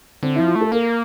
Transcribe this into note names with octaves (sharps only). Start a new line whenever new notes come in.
D3 C4
F3 E4
F4
A3
A4
A#3 A#4